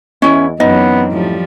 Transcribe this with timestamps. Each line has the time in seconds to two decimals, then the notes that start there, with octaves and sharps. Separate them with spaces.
0.22 E2 C#4 E4 D#5
0.60 F#2 E3 B3 C4 D#4 D#5
1.11 A2 F3 G3